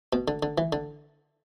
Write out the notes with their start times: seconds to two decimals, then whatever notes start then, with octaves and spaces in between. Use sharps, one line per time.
0.13 B2
0.28 D3
0.43 D3
0.58 E3
0.73 D3